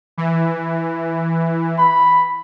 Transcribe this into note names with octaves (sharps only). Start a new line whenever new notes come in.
E3
B5